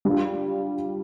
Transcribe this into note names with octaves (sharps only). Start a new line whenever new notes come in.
G3 D4 F4